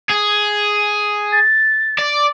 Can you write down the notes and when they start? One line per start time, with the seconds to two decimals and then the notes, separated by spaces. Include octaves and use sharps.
0.10 G#4
1.32 A6
1.99 D5